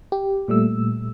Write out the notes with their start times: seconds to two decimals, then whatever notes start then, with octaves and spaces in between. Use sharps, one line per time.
0.12 G4
0.48 A#2 G3 A3 E6